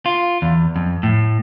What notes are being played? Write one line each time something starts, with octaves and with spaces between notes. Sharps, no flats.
F4
E2
F2
A2